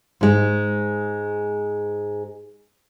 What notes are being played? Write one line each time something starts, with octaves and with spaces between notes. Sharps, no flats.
G#2 G#3